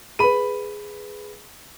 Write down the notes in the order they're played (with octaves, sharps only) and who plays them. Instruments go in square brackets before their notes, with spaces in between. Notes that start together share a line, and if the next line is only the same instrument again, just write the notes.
[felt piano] G#4 B4 [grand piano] B5 D#7